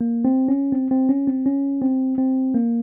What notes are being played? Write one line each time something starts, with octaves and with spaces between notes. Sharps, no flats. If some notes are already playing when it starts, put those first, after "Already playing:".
A#3
C4
C#4
C4
C4
C#4
C4
C#4
C4
C4
A#3